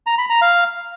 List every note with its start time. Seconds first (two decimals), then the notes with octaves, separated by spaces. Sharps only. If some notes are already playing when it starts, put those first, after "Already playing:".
0.06 A#5
0.18 B5
0.30 A#5
0.42 F5